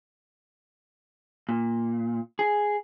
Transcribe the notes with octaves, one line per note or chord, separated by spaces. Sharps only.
A#2
G#4